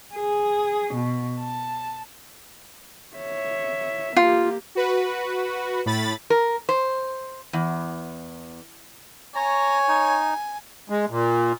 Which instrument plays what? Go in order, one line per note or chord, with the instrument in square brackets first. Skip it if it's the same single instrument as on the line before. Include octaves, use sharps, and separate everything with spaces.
[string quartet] G#4
B2
A5
[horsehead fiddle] C#5 E5
[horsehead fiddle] A#3 G4 [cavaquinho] F4
[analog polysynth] F#4 B4
A2 B5 A6
[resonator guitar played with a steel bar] A#4
C5
E2
[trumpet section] C#5 [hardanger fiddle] G#5 [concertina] A#5
[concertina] D#4
[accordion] G#3
A#2